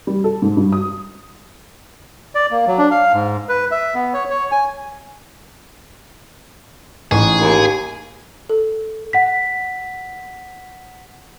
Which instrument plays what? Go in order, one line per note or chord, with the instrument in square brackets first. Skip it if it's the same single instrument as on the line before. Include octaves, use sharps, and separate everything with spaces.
[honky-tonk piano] G3
A4
G#2
G2
D#6
[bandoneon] D5
A#3
F#3
D4
F5
G#2
B4
E5
B3
C#5
C#5
G#5
[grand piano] A1 D#4 C#6 [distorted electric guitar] G#4
[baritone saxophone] D#2
[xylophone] A4
[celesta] F#5 B6